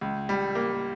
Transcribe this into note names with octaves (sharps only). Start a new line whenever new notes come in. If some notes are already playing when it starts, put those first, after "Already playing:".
C#2
G3
A#3